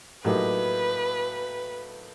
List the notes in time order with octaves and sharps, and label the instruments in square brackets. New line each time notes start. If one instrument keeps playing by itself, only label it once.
[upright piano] A2 F#3 A#3 D#4 G4 [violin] B4